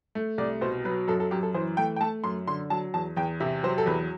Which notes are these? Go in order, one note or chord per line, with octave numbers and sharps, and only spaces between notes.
A3
C2 D5
B2 C5
F#3 B4
F#2 A4
A4
F#2 G4
A4
E3 C5
A3 G5
G5
A3 A5
F#2 C6
D3 C6
F#3 A5
E2 A5
E2 G5
C3 E5
F#3 C5
A4
E2 B4